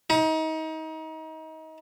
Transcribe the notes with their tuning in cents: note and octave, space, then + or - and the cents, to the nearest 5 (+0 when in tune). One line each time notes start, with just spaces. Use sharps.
D#4 +30